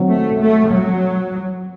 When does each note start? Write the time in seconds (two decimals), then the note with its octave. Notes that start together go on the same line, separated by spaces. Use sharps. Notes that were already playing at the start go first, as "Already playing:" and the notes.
Already playing: D#3 F#3 C4
0.08 A3
0.40 A3
0.70 F#3